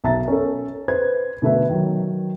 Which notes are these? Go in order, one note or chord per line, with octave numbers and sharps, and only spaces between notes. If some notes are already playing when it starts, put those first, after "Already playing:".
B1 E5 A5 A#5 A6
C#4 A4
B4 C5 G#6
B2 D3 A3 B4 E5
D#3 F#3